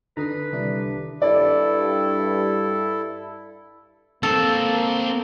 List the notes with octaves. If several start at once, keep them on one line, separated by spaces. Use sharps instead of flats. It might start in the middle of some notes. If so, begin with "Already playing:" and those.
D3 B4 A#5 D#6 C7
C2 D#3 D4 E4 G4 D5
G2 E4 A4 D5
A#3 C4 A4 A#4